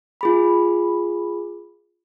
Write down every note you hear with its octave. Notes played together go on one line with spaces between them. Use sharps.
F4 G#4 B5